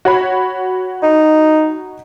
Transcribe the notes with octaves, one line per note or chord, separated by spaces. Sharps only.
F#4 C#5 B5
D#4